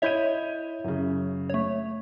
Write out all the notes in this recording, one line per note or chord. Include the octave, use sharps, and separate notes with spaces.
E4 C#5 D#5 E5 G6 D#7
F#2 C#3
A3 C#5